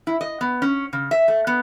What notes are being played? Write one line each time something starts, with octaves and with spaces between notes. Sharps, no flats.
E4
D#5
B3
C#4
C#3
E5
A3
B3